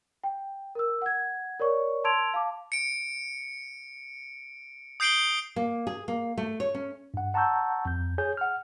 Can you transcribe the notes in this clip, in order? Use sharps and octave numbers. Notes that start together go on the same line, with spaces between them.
G5
A#4 E6
F#5 G#6
A#4 C#5 D5 C#6
A5 C6 E6 G#6 D7 F7
F5 A5 D6
C#7 D7
D#6 G6 C7 D7 F#7 G7
A#3
G#4
A#3
A3
C#5
C#4
G2 F#5
F#5 A5 A#5 C#6 E6 G6
F2 G6
G#4 C#5 G#5 G6
F#5 F6